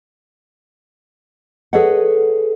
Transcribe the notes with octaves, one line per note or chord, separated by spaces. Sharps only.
G#4 A4 B4 C#5 D#5 F#5